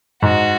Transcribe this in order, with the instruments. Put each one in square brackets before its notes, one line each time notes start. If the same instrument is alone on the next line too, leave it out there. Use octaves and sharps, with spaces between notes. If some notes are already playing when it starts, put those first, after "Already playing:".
[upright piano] G#2 [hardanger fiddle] F#4